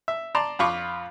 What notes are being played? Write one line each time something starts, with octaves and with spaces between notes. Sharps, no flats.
E5
D5 A5 A#5 C6
F2 F4 B5 C#6 D6